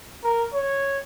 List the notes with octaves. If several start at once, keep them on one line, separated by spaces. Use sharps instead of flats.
A#4
C#5